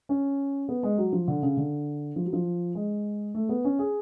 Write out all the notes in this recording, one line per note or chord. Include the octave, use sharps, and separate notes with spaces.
C#4
B3
G#3
F#3
F3
D3
C#3
D3
F3
F#3
F3
G#3
A3
B3
C#4
G#4